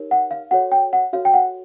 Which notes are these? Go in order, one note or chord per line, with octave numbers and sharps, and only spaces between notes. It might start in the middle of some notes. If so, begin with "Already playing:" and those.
Already playing: D#4 G4 A#4 C#5
F#5
F5
F#4 A4 C#5 F#5
G5
F#5
F#4 A4 C#5 F5
G5
F#5